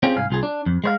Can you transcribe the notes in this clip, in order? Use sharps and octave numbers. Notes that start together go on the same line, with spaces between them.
C4 C#4 F4 G4 G#4
C2 G#2 F5 G#5
C2 F4 G#4
D4
F2
G#3 C5 F5